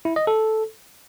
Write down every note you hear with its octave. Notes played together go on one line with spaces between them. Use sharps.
E4
D#5
A4